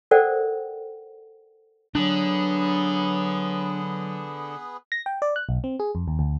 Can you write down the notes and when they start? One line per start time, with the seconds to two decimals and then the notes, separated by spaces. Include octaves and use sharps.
0.11 A4 A#4 C5 D5 F#5 G5
1.95 D3 F#3 B3 D4 G#4 B4
4.92 A#6
5.06 G5
5.22 D5
5.36 F#6
5.49 B1
5.64 C4
5.80 G#4
5.95 F2
6.08 D#2
6.19 D2